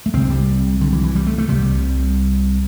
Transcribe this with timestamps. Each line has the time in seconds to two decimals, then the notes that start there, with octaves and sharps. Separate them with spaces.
0.06 A3
0.14 C2 C3 C4
0.30 G3
0.81 D3
0.93 E3
1.04 E3
1.16 G3
1.27 A3
1.38 A3
1.48 C2 C3 G3